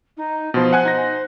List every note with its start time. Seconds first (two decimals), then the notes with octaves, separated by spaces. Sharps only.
0.17 D#4
0.54 B2 F3 C5
0.73 F#5 G#5 F#6
0.85 D#4 A#6